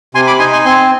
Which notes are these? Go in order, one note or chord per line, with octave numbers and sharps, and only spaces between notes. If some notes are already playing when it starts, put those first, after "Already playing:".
C3 G#5 C6
B5 D6
D#4 G#5 C6
G#5 C6
C4 G#5 C6